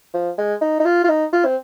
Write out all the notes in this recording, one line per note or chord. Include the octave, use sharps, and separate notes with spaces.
F3
G#3
D#4
D#4
F4
F4
D#4
F4
C4